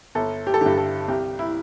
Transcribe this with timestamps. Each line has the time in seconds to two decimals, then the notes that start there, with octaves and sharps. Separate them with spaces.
0.15 G1 A4
0.47 G4
0.54 A4
0.61 G2 D3 G4
0.78 A4
1.08 C2 G4
1.39 E4